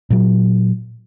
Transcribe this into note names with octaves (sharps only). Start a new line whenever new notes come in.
A#2 F#3